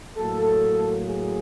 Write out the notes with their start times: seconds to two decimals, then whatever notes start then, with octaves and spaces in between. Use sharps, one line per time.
0.17 A2 F#3 A#3 A4
1.08 G#4